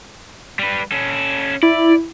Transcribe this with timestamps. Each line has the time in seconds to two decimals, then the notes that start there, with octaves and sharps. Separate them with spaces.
0.59 G3 B4
0.92 C#4 A4
1.63 E4 D5